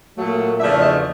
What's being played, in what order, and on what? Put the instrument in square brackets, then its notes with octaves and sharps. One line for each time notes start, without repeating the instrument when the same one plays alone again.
[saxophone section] A#2 F#3 A3
E2 C#3 F3 A3 D4 E5
D#5